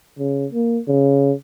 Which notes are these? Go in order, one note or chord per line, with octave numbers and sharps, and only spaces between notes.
C#3
A#3
C#3